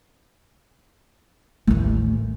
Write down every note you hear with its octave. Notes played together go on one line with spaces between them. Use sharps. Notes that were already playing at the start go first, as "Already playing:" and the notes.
A1 D#2